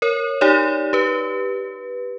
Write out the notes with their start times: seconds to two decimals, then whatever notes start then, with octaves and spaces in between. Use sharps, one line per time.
0.02 A#4 C#5
0.41 D#4 G4 C#5 D5
0.93 G4 B4